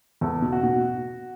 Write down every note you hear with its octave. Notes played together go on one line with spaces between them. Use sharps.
E2 A4
B2
F#4
B2